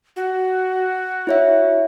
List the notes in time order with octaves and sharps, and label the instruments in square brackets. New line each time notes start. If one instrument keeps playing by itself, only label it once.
[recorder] F#4
[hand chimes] E4 C#5 E5